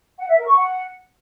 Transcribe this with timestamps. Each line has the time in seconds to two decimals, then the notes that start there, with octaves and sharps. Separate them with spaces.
0.19 F#5
0.29 E5
0.38 A#4
0.47 C#6
0.56 F#5